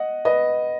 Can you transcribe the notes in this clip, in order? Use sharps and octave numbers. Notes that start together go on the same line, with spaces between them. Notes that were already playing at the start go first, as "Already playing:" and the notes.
Already playing: D#5 F#5
B4 D#5